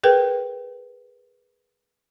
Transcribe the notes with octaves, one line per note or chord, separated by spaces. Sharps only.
G#4 A#4 B4 G5